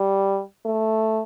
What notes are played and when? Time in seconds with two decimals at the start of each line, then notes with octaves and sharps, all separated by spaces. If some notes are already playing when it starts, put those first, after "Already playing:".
Already playing: G3
0.65 A3